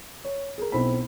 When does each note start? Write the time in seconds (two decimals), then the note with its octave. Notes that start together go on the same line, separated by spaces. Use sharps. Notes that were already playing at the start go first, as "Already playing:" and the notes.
0.25 C#5
0.58 G#4 A#4
0.72 B1 C4 E4 C5 B5